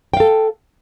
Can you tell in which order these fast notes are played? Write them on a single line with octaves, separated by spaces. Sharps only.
G5 F5 A4